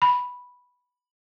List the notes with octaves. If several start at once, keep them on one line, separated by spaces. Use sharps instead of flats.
B5